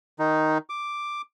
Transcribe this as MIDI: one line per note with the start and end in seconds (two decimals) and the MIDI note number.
0.19 0.58 51
0.19 0.58 63
0.70 1.22 86